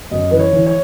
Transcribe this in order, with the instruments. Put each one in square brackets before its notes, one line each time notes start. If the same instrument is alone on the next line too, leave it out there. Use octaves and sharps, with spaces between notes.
[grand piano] F#2 D#5
E3 B4
C#5
E3
C#5